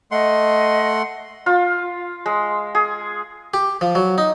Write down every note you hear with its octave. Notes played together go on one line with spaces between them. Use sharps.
A3 D#5 F#5 C6
F4
G#3
G#4
G4
F3
F#3
D#4